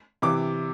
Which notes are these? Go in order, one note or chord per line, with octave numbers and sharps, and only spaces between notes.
C3 E3 D6